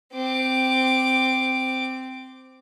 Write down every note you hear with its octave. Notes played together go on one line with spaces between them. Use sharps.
C4 D6